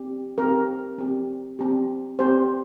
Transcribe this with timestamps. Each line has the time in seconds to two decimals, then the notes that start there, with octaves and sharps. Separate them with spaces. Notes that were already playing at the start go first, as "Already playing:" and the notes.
Already playing: C4 G4
0.38 C4 G4 A#4
0.98 C4 G4
1.59 C4 G4
2.19 C4 G4 C5